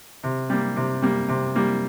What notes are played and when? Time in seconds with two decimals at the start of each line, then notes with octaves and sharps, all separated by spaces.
0.23 C3
0.50 G3 A#3
0.76 C3
1.02 G3 A#3
1.28 C3
1.56 G3 A#3